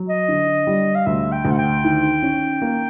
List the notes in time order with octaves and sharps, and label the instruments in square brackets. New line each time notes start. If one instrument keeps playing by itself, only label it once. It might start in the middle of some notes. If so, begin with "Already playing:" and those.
Already playing: [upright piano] F#3
[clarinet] D#5
[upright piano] D3
G3
[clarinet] F5
[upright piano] D2 [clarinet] E5
[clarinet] G5
[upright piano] D2
[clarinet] F#5
G5
[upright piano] D#3
C#4
A#3